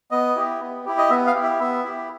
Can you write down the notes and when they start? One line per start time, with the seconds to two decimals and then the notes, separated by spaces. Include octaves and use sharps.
0.11 B3 D#5
0.36 E4 G4
0.60 B3
0.86 E4 G4
0.98 D#5
1.10 B3 E5
1.27 F5
1.35 E4 G4
1.43 E5
1.60 B3 E5
1.84 E4 G4